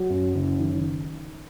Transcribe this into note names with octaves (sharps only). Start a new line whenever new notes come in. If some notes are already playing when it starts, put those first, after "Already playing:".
Already playing: F#3
F#2
F#1
D#3